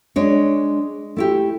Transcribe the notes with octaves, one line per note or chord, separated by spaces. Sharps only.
G#3 D4 C#5
A3 E4 G4